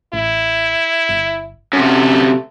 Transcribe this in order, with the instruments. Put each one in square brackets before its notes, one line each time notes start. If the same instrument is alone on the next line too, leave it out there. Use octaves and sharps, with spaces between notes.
[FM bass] A1 [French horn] E4
[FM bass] G1
[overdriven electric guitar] F#2 C3 [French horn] A3 [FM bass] C#4